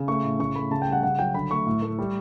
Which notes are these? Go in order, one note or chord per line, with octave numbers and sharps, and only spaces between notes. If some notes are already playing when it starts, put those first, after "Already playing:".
Already playing: C#3
A3 C#6
A2
C#3 C#6
A3 B5
C#3 A5
G5
G3
F#5
C#3 F#5
F#3 G5
D3 B5
A3 C#6
A2
A3
G3